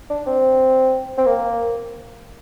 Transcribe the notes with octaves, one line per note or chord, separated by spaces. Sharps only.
D4
C4
C4
A#3